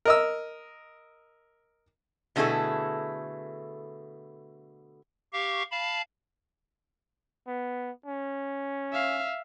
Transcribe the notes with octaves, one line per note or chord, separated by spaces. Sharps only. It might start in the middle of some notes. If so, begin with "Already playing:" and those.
A#4 D#5 E6
B2 D3 A3 E4 G#4 A4
G4 F5 C#6
F5 A5 B5
B3
C#4
E5 F5